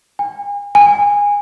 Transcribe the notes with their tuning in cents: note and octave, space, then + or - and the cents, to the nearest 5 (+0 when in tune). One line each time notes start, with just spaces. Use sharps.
G#5 -40
G#5 -20